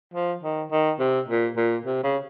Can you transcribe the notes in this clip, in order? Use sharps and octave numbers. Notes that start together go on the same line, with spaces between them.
F3
D#3
D#3
C3
A#2
A#2
C3
C#3